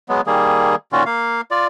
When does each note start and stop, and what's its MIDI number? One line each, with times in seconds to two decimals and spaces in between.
0.09 0.21 54
0.09 0.21 56
0.09 0.21 59
0.27 0.75 51
0.27 0.75 55
0.27 0.75 58
0.27 0.75 68
0.93 1.03 46
0.93 1.03 51
0.93 1.03 61
0.93 1.03 65
0.93 1.03 66
1.06 1.41 58
1.06 1.41 77
1.51 1.67 65
1.51 1.67 74